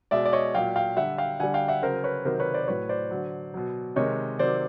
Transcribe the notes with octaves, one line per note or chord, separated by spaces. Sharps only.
B2 G#3 D5 E5
D5
C#5 D#5
A#2 F#3 F5 G5
F5 G5
D3 G3 E5 F#5
F5 G5
D3 G3 F#5 G#5
F5 G5
E5 F#5
C#3 F#3 A#4 C5
B4 C#5
C3 D#3 F#3 A#4 C5
B4 C#5
C5 D5
C5
A2 F#3 B4 C#5
C5 D5
D3 F#3
B2 F#3
C3 D#3 G#3 C#5 D#5
C3 D#3 F#3 C5 D5